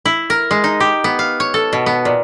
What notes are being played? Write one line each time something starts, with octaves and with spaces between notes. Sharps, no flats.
E4
A#4
G#3
D#4
G4
B3
F5
C#5
A4
B2
B3
A#2